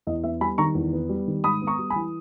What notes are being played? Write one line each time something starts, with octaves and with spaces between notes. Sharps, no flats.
E2 D#5
B3 E5
G3 G#5 B5
D#3 A#5 C#6
E2
B3
G3
D#3
G#2 B5 D#6
B3
A#5 C#6
G3
G#5 B5
E3